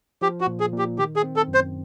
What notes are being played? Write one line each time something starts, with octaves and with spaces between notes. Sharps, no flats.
F3 G4
F#4
A#2
G#4
A#2
G4
D#3 G4
G#4
C4
A4
F#2
C5